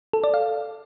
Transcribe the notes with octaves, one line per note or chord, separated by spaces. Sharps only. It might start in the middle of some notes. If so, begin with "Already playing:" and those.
A4
D5
F5